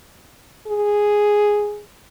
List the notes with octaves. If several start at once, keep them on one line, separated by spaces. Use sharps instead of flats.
G#4